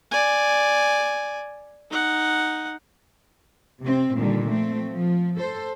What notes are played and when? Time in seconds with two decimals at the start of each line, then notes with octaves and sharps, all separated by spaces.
0.11 D5 G#5
1.91 D#4 F#5
3.81 C3 C4
4.16 A#2 D3 D#3 G3
4.48 F3 A3 C4
4.91 F3
5.37 A4 C5